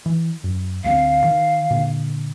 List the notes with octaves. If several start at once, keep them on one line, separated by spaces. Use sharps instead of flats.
E3
F#2
D2 G3 C4 F5
D#3
A#2 D3